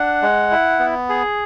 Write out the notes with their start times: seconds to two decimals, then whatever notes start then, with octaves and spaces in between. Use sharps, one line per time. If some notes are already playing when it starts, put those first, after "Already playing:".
Already playing: D4 F#5
0.22 G#3
0.51 E4
0.79 B3
1.09 G#4